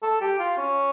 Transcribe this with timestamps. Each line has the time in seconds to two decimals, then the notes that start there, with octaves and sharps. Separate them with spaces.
0.03 A4
0.21 G4
0.39 F4
0.58 C#4